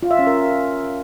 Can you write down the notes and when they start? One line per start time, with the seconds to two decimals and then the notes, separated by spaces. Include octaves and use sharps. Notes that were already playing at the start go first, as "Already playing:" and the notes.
0.03 F4
0.11 E5
0.19 C#4
0.27 A#4